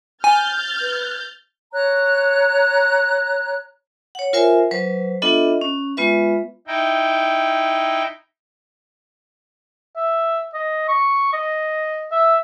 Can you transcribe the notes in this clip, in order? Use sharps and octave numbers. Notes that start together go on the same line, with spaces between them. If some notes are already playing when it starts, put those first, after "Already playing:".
G#5 F6 G6 A6
B4
C#5 A#5 F#6
C#5 F#5
F4 A#4 C5 E5 G#5
F#3 B4 C5
B3 D4 F4 A4 D#5 E5
C#4
G#3 B3 F4 B4 E5
D#4 E4 G5
E5
D#5
C#6
D#5
E5